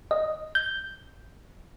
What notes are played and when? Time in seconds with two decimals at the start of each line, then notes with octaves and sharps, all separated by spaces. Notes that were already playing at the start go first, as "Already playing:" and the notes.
0.11 D#5
0.55 G6